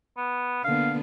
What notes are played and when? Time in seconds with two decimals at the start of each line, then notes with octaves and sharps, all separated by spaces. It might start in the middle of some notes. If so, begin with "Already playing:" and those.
0.17 B3
0.64 D3 A#3 B3 F5